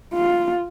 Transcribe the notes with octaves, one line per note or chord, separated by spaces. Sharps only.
F4